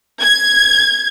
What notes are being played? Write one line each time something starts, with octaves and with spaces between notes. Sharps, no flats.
G#6